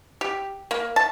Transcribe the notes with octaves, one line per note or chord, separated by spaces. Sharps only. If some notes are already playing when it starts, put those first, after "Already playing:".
G4
A#3
A5